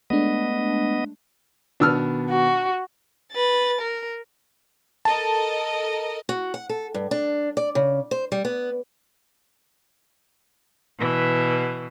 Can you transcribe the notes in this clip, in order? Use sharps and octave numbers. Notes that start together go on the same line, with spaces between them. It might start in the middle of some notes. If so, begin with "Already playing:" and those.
G#3 A3 B3 D4 D#5
B2 D#3 B3 D4 E6 F6
F#4
B4 A6
A#4
A4 A#4 D#5 A5
F#4
F#5
A4
G2
D4
D5
C#3
C5
G3
B3
B2 E3